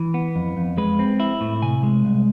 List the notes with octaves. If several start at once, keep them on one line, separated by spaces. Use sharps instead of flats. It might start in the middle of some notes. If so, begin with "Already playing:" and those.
Already playing: E3
B3
F2
F2
G#3 B4
C4
E4
A2
C3 G#5
G#3
C2